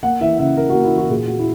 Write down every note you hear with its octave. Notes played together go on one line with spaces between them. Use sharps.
A#3 F#5
E3 E5
C#3 E5
C#3 A#4
F#4
A#3
E4
E3 F#4
A#2 G#4
A#3 F#4
E4